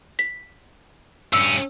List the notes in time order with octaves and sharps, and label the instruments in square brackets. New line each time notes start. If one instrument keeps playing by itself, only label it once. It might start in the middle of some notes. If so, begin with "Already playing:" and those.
[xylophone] B6
[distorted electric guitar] G2 C#4 [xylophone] E6